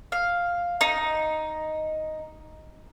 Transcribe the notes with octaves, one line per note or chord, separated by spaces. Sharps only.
F5
D#4